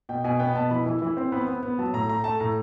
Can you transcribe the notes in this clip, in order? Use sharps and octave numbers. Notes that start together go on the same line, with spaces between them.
B2 G5
B2 G#5
B3 G5
B2 A5
E3 B5
E3
E3
C4
B3 B5
B3
B3
F#3 A5
A2 A#5
A3 A#5
A3 A5
A2 A#5